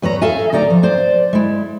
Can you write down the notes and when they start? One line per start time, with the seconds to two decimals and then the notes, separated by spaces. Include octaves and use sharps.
0.02 E2 B4 C#5 A#5
0.21 A4 E5 F5 G#5
0.53 D2 D#4 D5 A#5
0.70 F3
0.83 C5 D5
1.33 G#3 E4